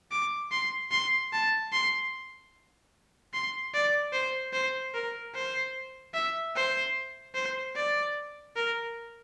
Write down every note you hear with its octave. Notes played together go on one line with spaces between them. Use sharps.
D6
C6
C6
A5
C6
C6
D5
C5
C5
A#4
C5
E5
C5
C5
D5
A#4